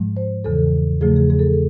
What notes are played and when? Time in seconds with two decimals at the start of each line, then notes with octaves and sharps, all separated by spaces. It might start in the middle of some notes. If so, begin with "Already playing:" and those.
Already playing: G#2 F3 G#3
0.17 C5
0.44 E2 C#3 E3 A4
1.01 E2 C#3 F3 A3 G#4
1.16 G#4
1.30 G#4
1.39 A4